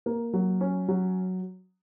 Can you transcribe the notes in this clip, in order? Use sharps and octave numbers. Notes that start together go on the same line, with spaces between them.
A#3
F#3
C#4
F#3